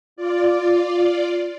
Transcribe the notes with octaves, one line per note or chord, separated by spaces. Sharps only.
F4 D5